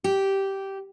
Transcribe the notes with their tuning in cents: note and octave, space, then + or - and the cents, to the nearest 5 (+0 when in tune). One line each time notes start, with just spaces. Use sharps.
G4 -10